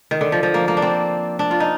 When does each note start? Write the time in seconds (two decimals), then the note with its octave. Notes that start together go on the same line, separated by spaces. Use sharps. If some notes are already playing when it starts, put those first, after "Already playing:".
0.11 D#3
0.21 D3
0.32 F3
0.43 F3
0.54 A#3
0.68 A#3
0.77 D4
0.82 C4
1.39 D4
1.51 F4
1.60 D#4